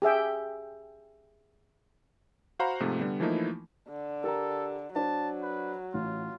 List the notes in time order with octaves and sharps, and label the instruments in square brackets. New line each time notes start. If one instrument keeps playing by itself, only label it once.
[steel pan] G4 G#4 E5 G5
[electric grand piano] F#4 C5 F5 F#5 A#5 B5
G#2 C3 F3 A3
D3 G3 B3
E3 F3 A3 A#3 D#4 E4
[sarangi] D3
[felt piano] G4 A#4 A#5 [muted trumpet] A4
[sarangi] F#3 [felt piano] D4 C5 D5 [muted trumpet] A5
[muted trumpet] B4
[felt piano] A1 [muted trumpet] F4